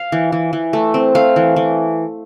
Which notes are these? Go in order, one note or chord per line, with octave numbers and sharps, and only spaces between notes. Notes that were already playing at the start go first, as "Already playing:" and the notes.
Already playing: F5
E3
E3
E3
A3
C4
A3 F5
E3
E3